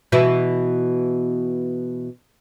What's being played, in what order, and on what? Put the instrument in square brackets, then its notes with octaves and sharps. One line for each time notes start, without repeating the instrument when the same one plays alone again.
[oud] B2 E3 E4